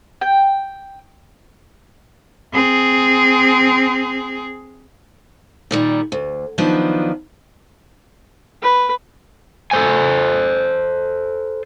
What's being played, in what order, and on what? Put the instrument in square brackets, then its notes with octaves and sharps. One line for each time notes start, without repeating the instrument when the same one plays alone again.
[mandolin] G5
[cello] C4 G#4
[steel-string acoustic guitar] A#2 D#3 G3
D2
D#3 F3 F#3 B3 D4
[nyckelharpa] B4
[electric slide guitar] A4 C5 G#5